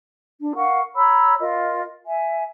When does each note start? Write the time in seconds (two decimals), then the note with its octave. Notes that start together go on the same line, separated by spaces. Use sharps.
0.39 D4
0.55 A#4 F5 F#5 C#6
0.95 C#5 A#5 B5 E6
1.39 F4 A#4 D#5
2.05 E5 G#5